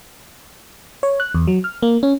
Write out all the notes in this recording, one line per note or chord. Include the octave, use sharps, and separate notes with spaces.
C#5
F#6
E2
F#3
F6
A#3
C#4